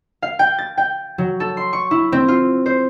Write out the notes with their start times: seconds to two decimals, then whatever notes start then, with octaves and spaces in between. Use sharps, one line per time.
0.22 F5
0.39 G5
0.58 A6
0.78 G5
1.18 F#3
1.40 A4
1.57 C6
1.73 C#6
1.91 E4
2.12 C4
2.28 F4
2.66 C5